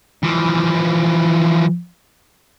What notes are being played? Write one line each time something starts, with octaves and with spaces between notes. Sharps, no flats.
E3 F3